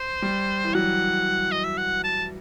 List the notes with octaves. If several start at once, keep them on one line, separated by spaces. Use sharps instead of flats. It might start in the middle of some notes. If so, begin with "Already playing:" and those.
Already playing: C5
G3
E3
F#3 F#5
D#5
E5
F#5
A5